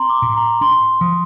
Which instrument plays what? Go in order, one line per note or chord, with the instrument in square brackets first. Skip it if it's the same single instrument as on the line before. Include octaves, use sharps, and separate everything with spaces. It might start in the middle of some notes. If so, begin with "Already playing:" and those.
Already playing: [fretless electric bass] C4 [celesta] A#5 C6
[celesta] D6
[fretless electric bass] A2
[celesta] A#5
[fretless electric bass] D4 [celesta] C6
[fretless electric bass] F3 [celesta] D#6